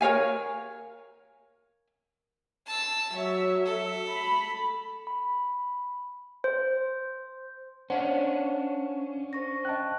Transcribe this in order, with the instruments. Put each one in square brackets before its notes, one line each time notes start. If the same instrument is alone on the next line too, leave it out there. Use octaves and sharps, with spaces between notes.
[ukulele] A#4 C#5 F5 G#5
[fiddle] A5 E6
[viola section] F#3 E5 [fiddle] C#5
[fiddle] A4
[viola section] B5
[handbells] B5
C5
[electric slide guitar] C#4 D4 [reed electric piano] C5 [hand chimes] F5 F#5
[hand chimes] C5 C#6 A#6
[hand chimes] D#5 F5 G5 [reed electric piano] A5 F#6